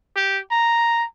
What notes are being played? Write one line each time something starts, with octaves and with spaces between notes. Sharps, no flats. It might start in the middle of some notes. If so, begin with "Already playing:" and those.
G4
A#5